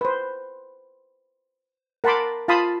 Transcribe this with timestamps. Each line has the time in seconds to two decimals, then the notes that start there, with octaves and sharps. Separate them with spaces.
0.01 B4 C5
2.04 A#4 F#5 A5 B5 C6 D6
2.48 F4 F5 A5 B5 C6 D#6